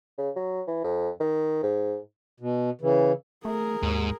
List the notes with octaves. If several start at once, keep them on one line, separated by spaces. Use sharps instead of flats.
C#3
F#3
E3
F2
D#3
G#2
B2
C#3 E3
A3 G#4 A#4
D#2 G#2